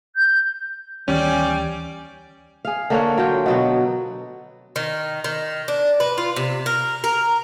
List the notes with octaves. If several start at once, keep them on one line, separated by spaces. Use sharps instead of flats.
G6
D2 D#3 E3 G3 C#4 D5 G#5
G#4 F5
D3 A#3 C#5 F#5
F#3 F4 G5
B2 F#3 B3
D#3
D#3
D4
B4
F4
C3
A#4
A#4